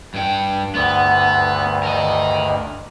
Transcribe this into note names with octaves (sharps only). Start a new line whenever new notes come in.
G2 G5
D2 G2 D3 B3
A#4 D#5